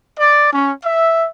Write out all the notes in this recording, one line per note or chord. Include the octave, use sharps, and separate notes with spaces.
D5
C#4
E5